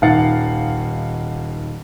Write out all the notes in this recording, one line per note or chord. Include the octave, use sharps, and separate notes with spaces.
D#1 D#3 F5 F#5 A6 C#7